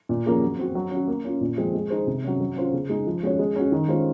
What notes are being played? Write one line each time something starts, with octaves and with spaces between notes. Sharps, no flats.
A#2
F3 A#3 C#4 G#4
F#3
C4 F#4
F#3
C#4 F#4
A#3
C#4 F4
A#2
F3 G#3 C4
G#3
D#4 G#4 C5
C3
F#3 C#4
F#3
C#4 F4 C5
C#3
G#3 D#4
F3
G#3 C#4 F#4 C#5
G#3
C#4 F#4
D#3
G#3 C#4 F4 C5